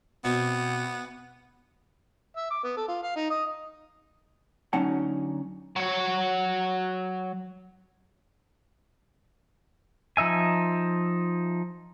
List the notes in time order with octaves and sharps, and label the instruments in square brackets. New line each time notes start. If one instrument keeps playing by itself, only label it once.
[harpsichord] B2 C4 [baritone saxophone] B3
[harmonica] E5
D6
B3
A4
F4
F5
D#4
D#5
[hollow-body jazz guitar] D2 F#3 C#4 D#4 F#5 A5
[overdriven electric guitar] F#3 C#5
[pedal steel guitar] F3 D#4 E5 G#5